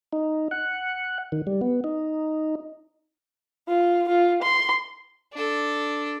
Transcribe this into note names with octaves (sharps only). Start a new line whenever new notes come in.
D#4
F#5
D#3
G3
B3
D#4
F4
F4
C6
D4 A4